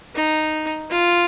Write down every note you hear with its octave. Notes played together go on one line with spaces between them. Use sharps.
D#4
F4